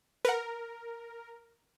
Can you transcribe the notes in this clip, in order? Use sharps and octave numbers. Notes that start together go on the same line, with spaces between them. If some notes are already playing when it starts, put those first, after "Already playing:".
A#4 B4 F#5